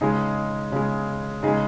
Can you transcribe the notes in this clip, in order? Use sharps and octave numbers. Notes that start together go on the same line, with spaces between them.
C#3 G#3 D#4 G#4
C#3 G#3
C#3 G#3 D#4 G#4